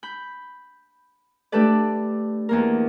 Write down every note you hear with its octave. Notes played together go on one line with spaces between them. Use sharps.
B5 G6
A3 D4 G4 A4 B4 D5
E2 A#3 A#4